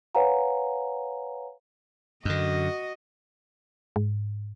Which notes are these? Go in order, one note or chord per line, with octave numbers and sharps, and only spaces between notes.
B4 C#5 F5 F#5 G#5 A#5
F#2 D3 F#4 D#5
G#2